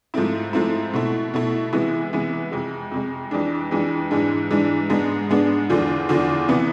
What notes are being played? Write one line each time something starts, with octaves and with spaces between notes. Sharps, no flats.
G#2 F3 A3 C4 E4
G#2 F3 A3 C4 E4
B2 A3 E4
B2 A3 E4
C3 E3 G#3 B3 E4
C3 E3 G#3 B3 E4
F2 C3 G#3
F2 C3 G#3
F2 E3 G#3 D4
F2 E3 G#3 D4
G#2 E3 G#3 D4
G#2 E3 G#3 D4
G#2 G#3 B3 D4
G#2 G#3 B3 D4
E2 D3 F3
E2 D3 F3
C3 E3 B3 E4